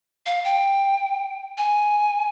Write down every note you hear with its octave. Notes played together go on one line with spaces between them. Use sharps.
F5
G5
G#5